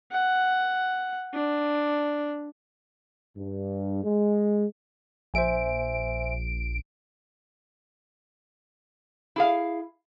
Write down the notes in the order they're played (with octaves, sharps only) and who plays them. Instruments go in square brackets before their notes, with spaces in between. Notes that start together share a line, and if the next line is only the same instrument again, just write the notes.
[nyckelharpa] F#5
D4
[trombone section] G2
G#3
[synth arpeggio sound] A#1 D7 [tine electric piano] C5 E5 G#5
[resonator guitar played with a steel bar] E4 G#4 F5